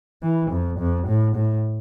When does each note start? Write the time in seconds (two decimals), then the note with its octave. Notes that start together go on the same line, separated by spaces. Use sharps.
0.22 E3
0.51 F2
0.79 F2
1.08 A2
1.35 A2